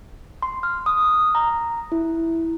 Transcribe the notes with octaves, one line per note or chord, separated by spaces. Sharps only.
C6
F6
D#6
A#5
E4